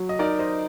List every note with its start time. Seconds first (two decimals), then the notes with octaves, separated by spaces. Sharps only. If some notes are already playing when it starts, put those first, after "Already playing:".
Already playing: F#3
0.09 D#5
0.19 D#4 A#4 D5
0.39 C5 D#5